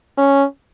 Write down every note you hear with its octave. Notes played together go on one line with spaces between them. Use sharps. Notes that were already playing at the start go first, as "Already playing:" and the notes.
C#4